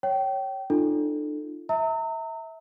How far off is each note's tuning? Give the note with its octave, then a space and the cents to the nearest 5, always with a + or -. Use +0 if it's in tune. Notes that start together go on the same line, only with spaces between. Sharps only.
C#5 +0 G5 -25
D4 +45 F4 -35 A4 +0
E5 -25 A#5 -35 E6 -40